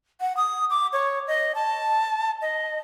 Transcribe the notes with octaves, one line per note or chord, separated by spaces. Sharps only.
F#5
D#6
D6
C#5
D#5
A5
D#5